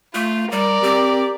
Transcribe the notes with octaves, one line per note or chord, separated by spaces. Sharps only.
A3 F4
G3 A#4 D5
C4 G4